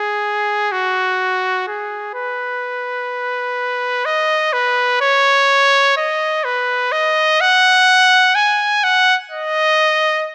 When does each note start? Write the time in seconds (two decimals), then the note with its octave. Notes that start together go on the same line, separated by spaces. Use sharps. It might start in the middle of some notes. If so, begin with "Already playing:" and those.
Already playing: G#4
0.72 F#4
1.68 G#4
2.15 B4
4.05 D#5
4.53 B4
5.01 C#5
5.97 D#5
6.44 B4
6.92 D#5
7.41 F#5
8.35 G#5
8.84 F#5
9.31 D#5